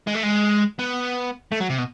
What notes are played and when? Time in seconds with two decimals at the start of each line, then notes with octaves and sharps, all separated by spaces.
0.07 G#3
0.14 A3
0.23 G#3
0.79 B3
1.52 A3
1.60 F#3
1.70 C3
1.78 B2